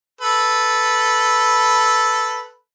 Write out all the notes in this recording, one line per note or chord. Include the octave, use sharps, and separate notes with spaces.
A4 B4